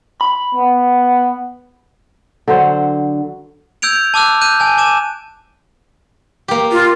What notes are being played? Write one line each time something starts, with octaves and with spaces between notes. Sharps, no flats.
B5
B3
D3 F#3 C5
E6 G6 G#6 D7 F7
A5 D6 E6 F#6
F#6 G6 D#7
G#5 A5
A5 D6 E7
A#3 G4
F4